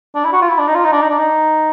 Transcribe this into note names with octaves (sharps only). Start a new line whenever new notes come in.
D4
E4
F#4
F4
E4
D4
D#4
F4
D#4
D4
D#4
D4
D#4